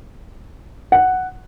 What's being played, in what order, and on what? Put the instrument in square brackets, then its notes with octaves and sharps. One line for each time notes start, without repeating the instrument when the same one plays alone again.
[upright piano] F#5